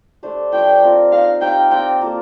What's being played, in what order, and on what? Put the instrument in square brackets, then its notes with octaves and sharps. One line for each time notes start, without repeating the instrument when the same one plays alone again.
[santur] A3 D4 G4 C5
[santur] F3 A3 D4 [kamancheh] G5
[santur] C4 F4 A#4
[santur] D#4 A#4 D#5 [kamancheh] F5
[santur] D#4 G4 C5 F5 [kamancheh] G5
[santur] C4 F4 A#4 D5 [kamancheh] G5
[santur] A#3 F4 A4